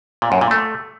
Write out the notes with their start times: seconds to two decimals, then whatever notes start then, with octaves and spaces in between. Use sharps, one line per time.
0.22 A#2
0.32 F#2
0.41 A#2
0.51 A3